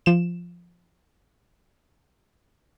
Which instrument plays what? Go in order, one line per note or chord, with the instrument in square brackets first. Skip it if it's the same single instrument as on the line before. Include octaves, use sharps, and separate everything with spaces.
[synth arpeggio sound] F3 E7